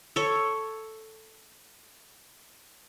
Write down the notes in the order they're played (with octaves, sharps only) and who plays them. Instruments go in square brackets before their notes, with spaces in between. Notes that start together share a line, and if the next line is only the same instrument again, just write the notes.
[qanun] A4 C#5